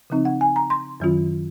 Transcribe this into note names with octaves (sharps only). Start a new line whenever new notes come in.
C#3 F3 C4 D#4
F#5
G#5
A#5
C6
F#2 D#3 F#3 C#4 F4